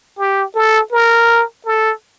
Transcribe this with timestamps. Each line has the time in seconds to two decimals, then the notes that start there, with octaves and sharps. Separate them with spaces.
0.19 G4
0.55 A4
0.92 A#4
1.66 A4